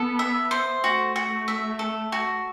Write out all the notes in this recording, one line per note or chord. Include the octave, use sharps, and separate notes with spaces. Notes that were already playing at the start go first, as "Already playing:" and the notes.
Already playing: B3 A4
E5
C5
A3 F#4
F#4
E5
A4
F#4